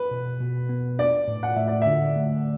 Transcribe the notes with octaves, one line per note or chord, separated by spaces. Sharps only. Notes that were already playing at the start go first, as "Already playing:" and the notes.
Already playing: B4
B2
B2
B3
D4 D5
A2
F#5
A2 E5
D5
D3 E5
A3